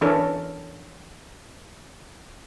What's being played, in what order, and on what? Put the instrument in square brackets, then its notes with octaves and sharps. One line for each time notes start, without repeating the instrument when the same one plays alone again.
[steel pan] E3 C#4 D4 A4 A#4